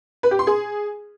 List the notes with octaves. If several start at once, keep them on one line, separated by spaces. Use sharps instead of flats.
B4
G4
C6
G#4